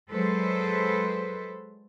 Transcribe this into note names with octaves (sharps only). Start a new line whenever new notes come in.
F#3 G#3 A4 B4 C5